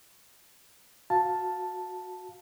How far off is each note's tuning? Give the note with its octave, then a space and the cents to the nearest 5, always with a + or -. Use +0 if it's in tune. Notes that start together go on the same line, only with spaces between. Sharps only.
F#4 -15 F5 +5 A5 +0